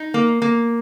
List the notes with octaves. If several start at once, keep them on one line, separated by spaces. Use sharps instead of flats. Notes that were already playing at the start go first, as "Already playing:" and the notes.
Already playing: D#4
A#3
A#3